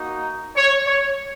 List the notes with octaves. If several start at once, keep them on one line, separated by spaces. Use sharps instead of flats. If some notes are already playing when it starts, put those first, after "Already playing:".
Already playing: A#3 D#4 F#4
C#5
C#5